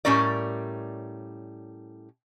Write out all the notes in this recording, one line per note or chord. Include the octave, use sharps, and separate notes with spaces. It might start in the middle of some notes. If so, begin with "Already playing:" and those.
A2 F#3 G3 C#4 A#4 D5